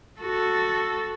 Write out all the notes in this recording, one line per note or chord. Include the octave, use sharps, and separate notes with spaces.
F#4 A4